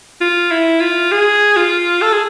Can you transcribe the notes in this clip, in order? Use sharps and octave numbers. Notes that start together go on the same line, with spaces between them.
F4
E4
F4
G#4
F4
A4
G#4